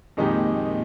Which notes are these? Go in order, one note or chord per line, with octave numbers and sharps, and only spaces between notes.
F2 A#2 D#3 G#3 D#4 G4